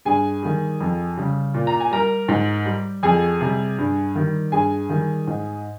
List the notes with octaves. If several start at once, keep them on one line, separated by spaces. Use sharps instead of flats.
G2 G#4 G#5
D#3 G3
F2
C#3 G3
A#2
A#5
G#5
G3 A#4 A#5
G#2
G3
F2 G#4 G#5
C3 G3
G2
D#3 G3
G2 G#4 G#5
D#3 G3
G#2